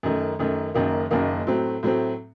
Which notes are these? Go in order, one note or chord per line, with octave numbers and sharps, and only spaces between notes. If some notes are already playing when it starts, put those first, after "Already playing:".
F#2 D#3 A3
F#2 D#3 A3
F#1 F#2 D#3 A#3
F#1 F#2 D#3 A#3
A2 F#3 A3 C4
A2 F#3 A3 C4